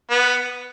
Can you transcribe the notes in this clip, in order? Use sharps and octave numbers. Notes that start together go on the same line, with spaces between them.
B3